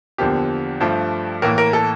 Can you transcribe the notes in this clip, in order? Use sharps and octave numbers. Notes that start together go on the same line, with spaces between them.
E2 D3 F3 A#3 G4
G2 F3 A3
A2 E3 A#3 A#4
A#4
A4